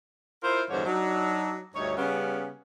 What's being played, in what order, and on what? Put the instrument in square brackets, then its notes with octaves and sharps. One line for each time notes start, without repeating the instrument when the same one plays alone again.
[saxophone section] E4 F4 A#4 C5
E2 G2 D3 D#3 C5 C#5
F#3 D4 D#4
D2 G2 D#4 C#5
C#3 G3 B3 C#4